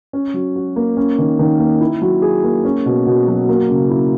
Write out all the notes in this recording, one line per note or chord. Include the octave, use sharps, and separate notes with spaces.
C#4
F#3
F#4
A#3
C#4
D#3
D#3
A#3
E4
F#3
G#4
A#3
C#4
B2
B2
F#3
A#3
C#3
E4